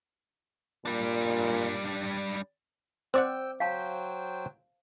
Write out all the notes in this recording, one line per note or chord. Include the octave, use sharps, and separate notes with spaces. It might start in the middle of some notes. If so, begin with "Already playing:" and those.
A#2 G3 D4
C4 C5 D5 F#5 G5 D6 E6
F#3 C5 F5 G5 A5